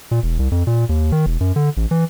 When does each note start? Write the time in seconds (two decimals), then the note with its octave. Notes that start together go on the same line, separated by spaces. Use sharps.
0.11 A#2
0.23 E1
0.39 C2
0.52 F2
0.67 A#2
0.89 D#2
1.12 D#3
1.26 E1
1.41 F#2
1.56 D3
1.77 A1
1.91 E3